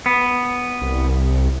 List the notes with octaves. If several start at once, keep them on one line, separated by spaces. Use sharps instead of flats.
B3
C2